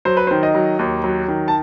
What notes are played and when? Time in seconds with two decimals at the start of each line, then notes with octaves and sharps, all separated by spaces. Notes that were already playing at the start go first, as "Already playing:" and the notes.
0.05 F#3 C5
0.17 B4
0.27 D#3 C5
0.43 D#5
0.55 F#3
0.79 D#2
1.04 F#3
1.28 D#3
1.48 A5